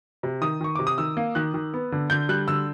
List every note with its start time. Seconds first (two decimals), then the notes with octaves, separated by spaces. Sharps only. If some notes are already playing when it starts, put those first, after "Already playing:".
0.23 C3
0.42 D#3 D#6
0.61 D#3 C#6
0.75 C3 D6
0.87 D#6
0.98 D#3 E6
1.17 A#3
1.35 D#3 F#6
1.54 D#3
1.74 B3
1.92 D3
2.10 D3 G6
2.29 G3 F#6
2.48 D3 E6